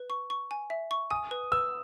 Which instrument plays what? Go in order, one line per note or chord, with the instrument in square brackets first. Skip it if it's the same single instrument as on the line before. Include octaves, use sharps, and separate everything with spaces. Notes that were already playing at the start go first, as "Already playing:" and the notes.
Already playing: [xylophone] B4
C#6
C#6
G#5
E5
C#6
[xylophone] G#5 [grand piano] D#6
[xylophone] B4
[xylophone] B4 [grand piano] E6